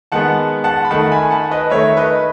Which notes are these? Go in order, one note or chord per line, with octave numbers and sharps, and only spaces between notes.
D#3 G#3 B3 F#5 A5
F#5 A5
B5
D#3 A3 F#5 A5
G#5 B5
F#5 A5
B4 D#5
D#3 A3 C#5 E5
B4 D#5